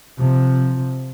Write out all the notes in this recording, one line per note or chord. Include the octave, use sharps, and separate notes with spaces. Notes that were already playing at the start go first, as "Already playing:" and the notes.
C3 F3